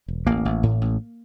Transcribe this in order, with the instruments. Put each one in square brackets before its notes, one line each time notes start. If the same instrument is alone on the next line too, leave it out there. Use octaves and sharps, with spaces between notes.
[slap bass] E1
A1 A#3
A1
A2
A1